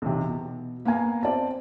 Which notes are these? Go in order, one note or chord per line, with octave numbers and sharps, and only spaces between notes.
B1 E2 C3
B2
A#3 B3 F5 G#5 A#5
C4 D5 A5